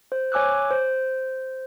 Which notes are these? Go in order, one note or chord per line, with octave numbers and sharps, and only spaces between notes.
C5
C#5 G#5 D6 E6 F#6
C5